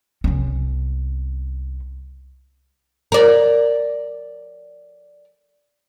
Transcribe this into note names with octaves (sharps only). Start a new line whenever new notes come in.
C2 C#4
A#4 D5